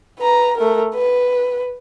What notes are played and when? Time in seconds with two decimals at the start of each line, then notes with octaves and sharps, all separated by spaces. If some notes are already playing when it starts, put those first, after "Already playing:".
0.19 B4 A#5
0.57 A3 A#4
0.94 B4